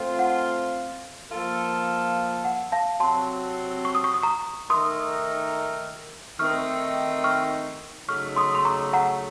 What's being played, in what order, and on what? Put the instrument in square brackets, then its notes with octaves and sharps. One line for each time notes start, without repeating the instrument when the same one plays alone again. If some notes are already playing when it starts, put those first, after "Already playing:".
Already playing: [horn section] A3 C4 F4
[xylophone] F#5
[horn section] F3 A#3 F4 A4
[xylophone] F#5
F5 A5
[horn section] C3 F#3 C4 F#4 A4 [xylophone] A5 C6
[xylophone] C#6
D#6
C#6
D#6
A#5 C#6
[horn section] D#3 A3 D#4 A#4 [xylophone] C6 D#6
[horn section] D#3 A3 C4 D#4 A#4 [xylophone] C#6 F6
[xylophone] C#6 F6
[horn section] C#3 F#3 A3 D#4 [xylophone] C#6 F6
[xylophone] C6 D#6
C6
A#5 C#6
F#5 A#5